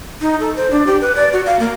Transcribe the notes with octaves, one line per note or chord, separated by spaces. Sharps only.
D#4
A4
C5
D4
G4
B4
D5
F#4
F5
A#3